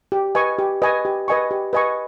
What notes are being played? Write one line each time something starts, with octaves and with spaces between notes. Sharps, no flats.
G4
B4 D#5 G#5 C#6
G4
B4 D#5 G#5 C#6
G4
B4 D#5 G#5 C#6
G4
B4 D#5 G#5 C#6